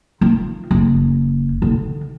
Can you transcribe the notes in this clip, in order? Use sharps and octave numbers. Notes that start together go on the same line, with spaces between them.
D#3 F4
F#1
D3 D#3